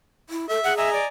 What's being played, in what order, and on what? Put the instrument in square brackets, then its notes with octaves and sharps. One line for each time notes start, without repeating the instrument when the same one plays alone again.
[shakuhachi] E4
[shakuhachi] A4 [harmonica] E5
[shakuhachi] G#4 [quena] F#5
[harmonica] D#5 G#5 A#5 [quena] E5
[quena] D5